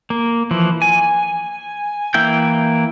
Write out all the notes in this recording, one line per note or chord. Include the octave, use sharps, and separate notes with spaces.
A#3
E3 F3
G#5
E3 A#3 E4 G5 G6